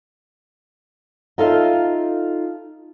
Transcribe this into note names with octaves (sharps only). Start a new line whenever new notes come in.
D#4 F4 A4 E5 F5